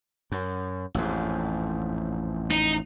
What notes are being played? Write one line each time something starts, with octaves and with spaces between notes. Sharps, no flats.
F#2
A1 F2 G#2
D#4